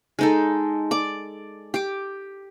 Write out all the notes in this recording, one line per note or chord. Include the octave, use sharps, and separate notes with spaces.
G#3 D#4 A4
D5 D6
G4 D6